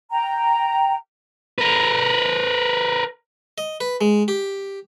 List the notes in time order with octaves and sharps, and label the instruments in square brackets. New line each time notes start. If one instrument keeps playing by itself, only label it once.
[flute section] G5 A#5
[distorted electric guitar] A#4 B4
[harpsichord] D#5
B4
G#3
G4